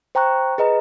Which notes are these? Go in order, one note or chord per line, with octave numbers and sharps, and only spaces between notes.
C5 G5 A#5 C#6 F#6
G#4 B4 D#5 A#5